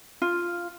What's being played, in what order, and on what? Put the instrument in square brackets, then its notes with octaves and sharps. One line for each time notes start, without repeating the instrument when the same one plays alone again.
[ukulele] F4